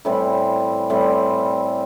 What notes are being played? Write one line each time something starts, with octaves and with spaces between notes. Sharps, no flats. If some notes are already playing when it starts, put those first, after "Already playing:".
A2 E3 G3 C4
A2 E3 G3 C4